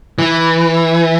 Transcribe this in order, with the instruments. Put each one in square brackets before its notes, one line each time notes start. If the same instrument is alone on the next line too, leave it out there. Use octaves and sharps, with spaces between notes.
[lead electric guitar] E3